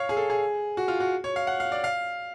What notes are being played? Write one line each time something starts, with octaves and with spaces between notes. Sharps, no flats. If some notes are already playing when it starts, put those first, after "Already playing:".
Already playing: C#5 F5
G#4
A4
G#4
F#4
F4
F#4
C#5
F5
F#5
F5
D5
F5